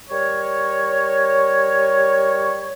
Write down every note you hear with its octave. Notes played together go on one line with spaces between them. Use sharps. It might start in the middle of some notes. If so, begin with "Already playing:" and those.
G3 A#4 C#5